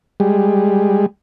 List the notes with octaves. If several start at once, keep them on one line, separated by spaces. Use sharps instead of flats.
G3 G#3